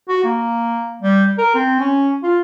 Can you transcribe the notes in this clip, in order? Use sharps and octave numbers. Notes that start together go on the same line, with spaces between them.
F#4
A#3
G3
A#4
C4
C#4
F4